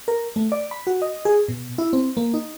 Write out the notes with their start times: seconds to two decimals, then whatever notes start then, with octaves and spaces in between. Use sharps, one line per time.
0.08 A#4
0.36 A3
0.52 D5
0.71 B5
0.87 F#4
1.02 D#5
1.25 G#4
1.48 B2
1.78 E4
1.93 C4
2.17 A#3
2.34 D#4